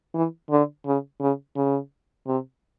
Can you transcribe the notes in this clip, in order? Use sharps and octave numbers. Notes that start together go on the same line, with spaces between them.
E3
D3
C#3
C#3
C#3
C3